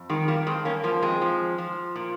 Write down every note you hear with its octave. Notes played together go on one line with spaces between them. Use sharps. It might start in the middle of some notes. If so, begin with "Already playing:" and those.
Already playing: F2
D#3 G#3
G3 A#3
G2 G#3 C4
A#3 C#4
F3 A#3 C#4
G#3 C4
F3
F3
A#2